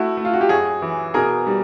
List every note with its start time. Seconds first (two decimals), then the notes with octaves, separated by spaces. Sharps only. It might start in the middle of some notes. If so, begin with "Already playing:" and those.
Already playing: A3 E4 F#4
0.17 A3
0.25 F4
0.33 F#4
0.41 G4
0.49 F#2 F#4 G#4
0.82 E3
1.14 B2 G#4 A#4
1.47 G3